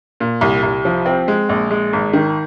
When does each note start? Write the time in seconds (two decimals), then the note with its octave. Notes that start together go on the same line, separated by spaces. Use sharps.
0.20 A#2
0.41 C2
0.63 C2
0.85 F3
1.06 C4
1.28 G#3
1.49 A#1
1.71 G#3
1.93 G#1
2.13 D#3